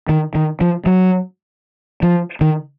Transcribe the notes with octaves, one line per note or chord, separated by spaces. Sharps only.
D#3
D#3
F3
F#3
F3
D#3